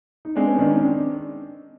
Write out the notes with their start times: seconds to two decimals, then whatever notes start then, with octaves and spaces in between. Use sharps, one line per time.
0.25 D#4
0.36 G#3 C4 D4
0.47 B3 C#4
0.54 D#4
0.58 D#3 C4 D4
0.70 C#4 D#4
0.81 C4 D4